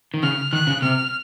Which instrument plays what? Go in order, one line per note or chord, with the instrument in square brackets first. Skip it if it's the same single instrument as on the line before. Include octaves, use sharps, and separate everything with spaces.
[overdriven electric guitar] D#3
[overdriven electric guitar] C#3 [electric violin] F6
[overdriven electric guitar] D#3 [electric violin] F#6
[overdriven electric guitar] C#3
[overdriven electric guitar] C3 [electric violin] F6